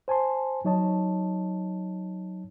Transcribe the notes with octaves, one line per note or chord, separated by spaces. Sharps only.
C5 G#5 A5 C6
F#3 D#4 C#5 D#5 A5